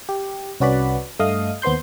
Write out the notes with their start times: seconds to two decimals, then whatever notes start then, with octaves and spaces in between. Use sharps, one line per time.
0.09 G4
0.60 C2 C#4 F#4 B4 D5 B5
1.19 G2 A3 D#5 F5 D#6
1.62 D#2 B3 C5 C6 G6